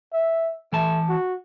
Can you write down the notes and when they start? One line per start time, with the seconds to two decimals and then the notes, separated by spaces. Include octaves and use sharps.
0.13 E5
0.73 E3 A3 A5
1.09 F#4